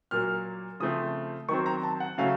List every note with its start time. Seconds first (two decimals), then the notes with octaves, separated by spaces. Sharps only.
0.11 A#2 F#3 A#3 F6
0.80 C#3 F3 A3 C4 D#6
1.49 D#3 F#3 C4 C#6
1.66 A#5
1.83 A5
2.00 F#5
2.18 C#3 F#3 A3 C#4 F5